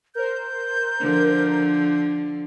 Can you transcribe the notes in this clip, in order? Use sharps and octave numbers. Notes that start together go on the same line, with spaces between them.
A#4 C5 G6
D3 F3